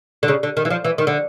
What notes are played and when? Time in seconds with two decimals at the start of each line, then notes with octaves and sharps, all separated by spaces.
0.23 D3
0.28 C#3
0.43 D3
0.57 D#3
0.65 E3
0.70 F3
0.84 E3
0.98 D#3
1.07 D3